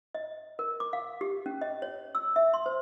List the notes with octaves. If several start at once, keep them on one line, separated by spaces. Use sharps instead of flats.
D#5
A#4
D6
F5
G4
C#4
D#5
C#5
E6
E5
C6
C5